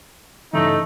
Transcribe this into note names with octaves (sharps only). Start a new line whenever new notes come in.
G2 C#3 E3 A3 D#4